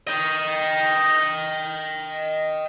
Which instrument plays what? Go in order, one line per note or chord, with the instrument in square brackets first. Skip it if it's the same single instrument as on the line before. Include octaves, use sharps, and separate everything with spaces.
[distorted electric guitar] D#5 G5